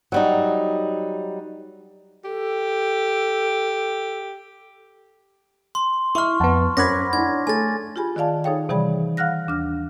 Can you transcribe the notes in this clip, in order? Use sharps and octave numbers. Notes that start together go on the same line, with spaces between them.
F#3 G3 D#4
G4 A4
C6
E4 E5 C6 C#6 F6
F2 B3 F#5 A5
F#2 C5 C#5 F#5 B5 D6 G#6 A#6
D4 E4 G#6
A3 A4 G#5 A6
F4 G4 G#4 G#5 B5
D#3 F4 D5 F5 A5
D#4 G#4 A4 C#5 F5 G5
C3 E3 G3 G#4 D5 B5
F5 F#5 F6 F#6 A#6
D#2 D4 F6